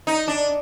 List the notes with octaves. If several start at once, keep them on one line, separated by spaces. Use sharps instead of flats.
D#4
D4